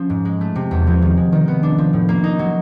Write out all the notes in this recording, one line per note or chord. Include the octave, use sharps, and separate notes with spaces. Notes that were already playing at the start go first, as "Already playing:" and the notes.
Already playing: F3 C#4
G#2
G#3
A3
C3
E2
F3
D#3
G#3
D#3
B3
D4
F3
A2
A#3
D#4
F#3